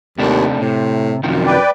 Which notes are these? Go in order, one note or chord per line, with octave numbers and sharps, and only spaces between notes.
D#2 C3 A3 D4
A2 C3
F#2 C3 D#3 F3
B4 D5 G5